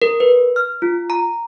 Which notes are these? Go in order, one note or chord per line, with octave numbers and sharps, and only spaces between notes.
A#4
B4
F6
F4
A#5